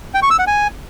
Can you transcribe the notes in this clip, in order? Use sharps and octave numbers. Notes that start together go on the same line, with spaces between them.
G5
C#6
E6
F#5
G#5